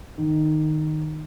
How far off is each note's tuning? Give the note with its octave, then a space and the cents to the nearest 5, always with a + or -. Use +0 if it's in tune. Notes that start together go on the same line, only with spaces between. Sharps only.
D#3 -10